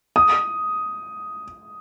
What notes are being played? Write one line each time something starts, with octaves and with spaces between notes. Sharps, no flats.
D#6